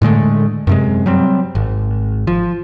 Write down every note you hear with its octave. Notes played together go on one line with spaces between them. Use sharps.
A2 D3 G#3 A3
F#2 C3 G#3
F#3 G3 C4
G#1
F3